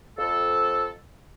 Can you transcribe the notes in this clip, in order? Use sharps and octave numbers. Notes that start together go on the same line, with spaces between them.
F2 A4